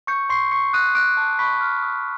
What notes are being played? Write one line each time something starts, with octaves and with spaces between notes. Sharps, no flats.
C#6 G6 C#7
C6 C#6 C7
C#6 C#7
D#6 F#6 D#7
D6 F#6 D7
A5
B5 C#6 B6
F6
D#6